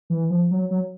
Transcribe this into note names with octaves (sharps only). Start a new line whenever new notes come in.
E3
F3
F#3
F#3